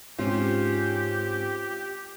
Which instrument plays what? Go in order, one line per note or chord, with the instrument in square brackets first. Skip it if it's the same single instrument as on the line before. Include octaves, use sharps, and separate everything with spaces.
[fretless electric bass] G#2 [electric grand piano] C4 C#4 [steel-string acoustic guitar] F4 [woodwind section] G4